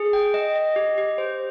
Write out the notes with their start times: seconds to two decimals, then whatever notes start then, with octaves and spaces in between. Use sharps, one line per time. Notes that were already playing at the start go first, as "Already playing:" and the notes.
Already playing: G#4
0.13 G5
0.34 D#5
0.56 D#5
0.76 G4
0.98 G4
1.18 C5